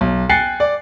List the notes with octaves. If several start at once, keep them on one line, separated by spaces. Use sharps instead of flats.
B1
G5 G#5 F#6 A6 C7 C#7
D5